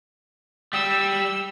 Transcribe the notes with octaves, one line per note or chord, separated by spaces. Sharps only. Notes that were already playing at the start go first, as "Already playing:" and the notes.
G3 E6